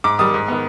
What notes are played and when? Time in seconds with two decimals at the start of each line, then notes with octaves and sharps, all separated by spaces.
0.04 G#2 D6
0.19 D#3 G3 D#6
0.34 G#2
0.48 D#3 B3